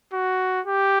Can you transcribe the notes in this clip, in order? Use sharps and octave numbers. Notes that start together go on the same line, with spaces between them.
F#4
G4